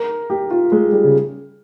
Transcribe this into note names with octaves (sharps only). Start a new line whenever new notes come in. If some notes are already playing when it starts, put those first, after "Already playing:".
Already playing: A#4
G4
F4
G#3
G3
C#3